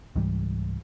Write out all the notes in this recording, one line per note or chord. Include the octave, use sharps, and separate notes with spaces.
C#2 G#2 E3 G3